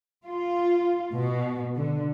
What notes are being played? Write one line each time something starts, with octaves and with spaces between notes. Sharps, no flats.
F4
B2
D3